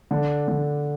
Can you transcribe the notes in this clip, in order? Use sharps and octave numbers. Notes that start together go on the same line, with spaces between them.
D3
D3